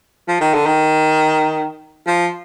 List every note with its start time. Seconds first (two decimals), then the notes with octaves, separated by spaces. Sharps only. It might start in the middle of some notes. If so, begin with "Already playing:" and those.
0.28 F3
0.41 D#3
0.54 D3
0.66 D#3
2.07 F3